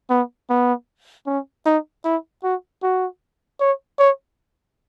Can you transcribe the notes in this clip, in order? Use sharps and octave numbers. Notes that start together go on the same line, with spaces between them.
B3
B3
C#4
D#4
E4
F#4
F#4
C#5
C#5